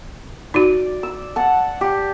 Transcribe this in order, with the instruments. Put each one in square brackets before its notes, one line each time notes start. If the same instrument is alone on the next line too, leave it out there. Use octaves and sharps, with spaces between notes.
[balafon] D#4 F#4 [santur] D5
[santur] E6
F#5 A5
G4